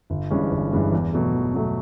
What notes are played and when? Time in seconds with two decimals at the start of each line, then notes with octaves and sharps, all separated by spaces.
0.10 G1
0.31 G2 E3 G#3 C#4
0.51 G1
0.73 G2 E3 G#3 C#4
0.92 E2
1.13 B2 F#3 A3
1.34 E2
1.54 B2 F#3 A3